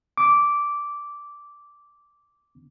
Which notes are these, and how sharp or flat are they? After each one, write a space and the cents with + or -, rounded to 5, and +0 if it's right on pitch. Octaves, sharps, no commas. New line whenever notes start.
D6 -10